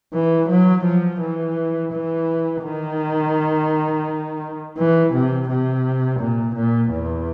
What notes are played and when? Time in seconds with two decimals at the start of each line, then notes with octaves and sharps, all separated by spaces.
0.14 E3
0.49 F#3
0.85 F3
1.20 E3
1.92 E3
2.63 D#3
4.78 E3
5.13 C3
5.49 C3
6.20 A#2
6.55 A#2
6.91 E2